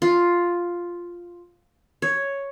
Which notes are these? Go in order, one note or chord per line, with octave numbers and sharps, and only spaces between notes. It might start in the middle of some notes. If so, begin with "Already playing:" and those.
F4
C#5